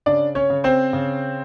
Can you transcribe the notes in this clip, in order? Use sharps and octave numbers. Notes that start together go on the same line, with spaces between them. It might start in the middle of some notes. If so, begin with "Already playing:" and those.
C#3 D4 D5
C#4 C#5
C#3
C4 C5
C#3